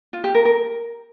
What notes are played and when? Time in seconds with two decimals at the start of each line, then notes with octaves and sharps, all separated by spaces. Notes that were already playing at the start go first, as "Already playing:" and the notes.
0.13 F4
0.24 G4
0.35 A#4
0.45 A#4